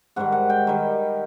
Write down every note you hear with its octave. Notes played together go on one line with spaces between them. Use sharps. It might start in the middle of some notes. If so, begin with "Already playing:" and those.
G#2 D#3 G3 F#5
F#5
G5
D#3 G3